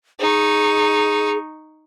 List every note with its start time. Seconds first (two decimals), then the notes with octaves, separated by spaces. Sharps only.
0.20 D#4 G#4 C#6